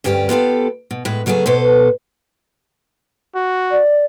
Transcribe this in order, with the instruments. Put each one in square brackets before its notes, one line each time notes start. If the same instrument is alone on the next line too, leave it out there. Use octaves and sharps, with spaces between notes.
[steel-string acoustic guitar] D2 G2 C#4 G4 C#5 D5
B3 F4 G4 A4
B2
A2 G#3 B4
C#3 F#3 A3 B3 G#4
B2 A4 B4 C5
[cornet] F#4
[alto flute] D5